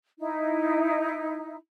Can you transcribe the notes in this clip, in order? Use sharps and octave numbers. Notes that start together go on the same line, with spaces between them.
D#4 E4